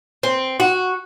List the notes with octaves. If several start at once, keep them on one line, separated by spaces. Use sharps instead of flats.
C4
F#4